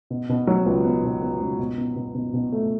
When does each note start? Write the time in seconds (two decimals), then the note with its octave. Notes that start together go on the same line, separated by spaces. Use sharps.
0.10 B2
0.29 B2
0.47 F#3
0.66 C#2
0.85 B3
1.03 B2
1.22 B3
1.40 C#2
1.59 B2
1.78 B2
1.96 B2
2.15 B2
2.34 B2
2.52 A3